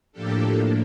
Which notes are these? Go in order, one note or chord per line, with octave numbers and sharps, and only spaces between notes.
A2 F3 A#3 D4 G4 A4